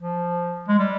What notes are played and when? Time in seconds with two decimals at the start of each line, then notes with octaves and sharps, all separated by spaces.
0.01 F3
0.68 G#3
0.79 G3